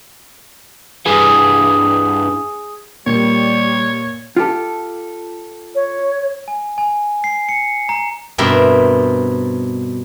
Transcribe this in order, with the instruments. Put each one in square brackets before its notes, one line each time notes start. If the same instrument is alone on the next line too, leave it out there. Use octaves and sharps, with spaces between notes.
[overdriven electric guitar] G2 E3 [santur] G#4
[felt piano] A#2 [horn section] G3 [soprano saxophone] C#5
[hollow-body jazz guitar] F4 G4 A4
[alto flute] C#5
[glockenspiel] G#5
G#5
C7
C#7
A#5
[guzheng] G2 B2 C4 A#4 E5